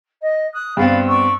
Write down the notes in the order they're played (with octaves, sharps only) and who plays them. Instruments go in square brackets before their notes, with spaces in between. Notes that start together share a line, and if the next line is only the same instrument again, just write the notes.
[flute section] D#5
D#6 F#6
[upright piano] G2 B3 C4 [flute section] D5 F5 B5
[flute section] D4 C#6 E6